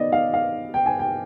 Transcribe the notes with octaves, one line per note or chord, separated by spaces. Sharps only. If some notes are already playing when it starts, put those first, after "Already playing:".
Already playing: D#3 B3 D5 D#5
F5
F5
G5
G#5
G5